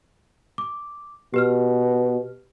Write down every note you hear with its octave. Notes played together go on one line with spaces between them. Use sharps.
D6
B2 G4 B4 F6